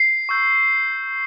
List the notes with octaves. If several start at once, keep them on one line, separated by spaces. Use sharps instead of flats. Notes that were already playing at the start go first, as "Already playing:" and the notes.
Already playing: C7
C#6 E6 G6